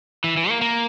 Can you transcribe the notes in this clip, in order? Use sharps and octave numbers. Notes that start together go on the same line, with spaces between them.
E3
E3
A#3
A#3